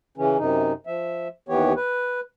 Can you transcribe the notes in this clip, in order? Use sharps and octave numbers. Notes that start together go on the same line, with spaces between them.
C#3 E3 C#4
F#2 C3 D#4
F3 E5
D#2 E3 B3 G4 C#5
B4